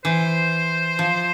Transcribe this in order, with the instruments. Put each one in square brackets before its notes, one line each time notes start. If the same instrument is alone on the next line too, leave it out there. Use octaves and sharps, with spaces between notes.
[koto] E3 [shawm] C5
[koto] F3